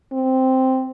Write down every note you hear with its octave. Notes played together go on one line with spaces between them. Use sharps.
C4